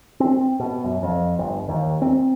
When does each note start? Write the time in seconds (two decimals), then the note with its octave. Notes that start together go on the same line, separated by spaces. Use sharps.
0.20 C4
0.60 B2
0.84 F#2
1.03 F2
1.39 G1
1.69 D#2
2.02 C4